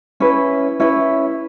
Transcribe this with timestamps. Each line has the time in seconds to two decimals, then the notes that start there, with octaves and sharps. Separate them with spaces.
0.20 C#4 E4 B4
0.80 C#4 E4 B4